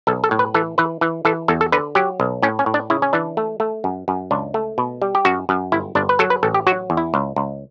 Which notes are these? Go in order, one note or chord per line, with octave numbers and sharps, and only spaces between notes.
B1 A4
A4
A2
B4
E3 A4
E3 B4
E3
E3 A4
E2 A4
A4
D3 B4
F#3 G4
B1
A2 C#4
C#4
A2
D4
C#3 E4
C#4
E3 D4
A3
A3
F#2
F#2
C#2 D4
A3
B2
G3
G4
F#2 F#4
F#2
G1 E4
G1 D4
B4
F#3 A4
B4
A1 A4
G4
F#3 F#4
E2
E4
C#2
C#2